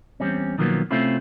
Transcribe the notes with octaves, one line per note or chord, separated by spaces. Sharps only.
E2 G#2 G3 C4 C#4
B2 D#3 F3 F#3 A#3 B3
C3 A3 C4 C#4 E4 F4